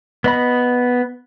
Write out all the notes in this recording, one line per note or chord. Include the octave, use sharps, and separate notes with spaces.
B3 D#5 B5